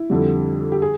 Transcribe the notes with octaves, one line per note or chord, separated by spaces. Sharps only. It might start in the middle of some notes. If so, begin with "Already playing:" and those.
Already playing: E4
F2 D3 G3
G4
G#4